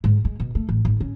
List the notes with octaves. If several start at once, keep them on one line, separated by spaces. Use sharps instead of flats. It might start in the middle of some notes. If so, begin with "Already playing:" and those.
G#2
G#3
B2
A3
A1
G#1
C#4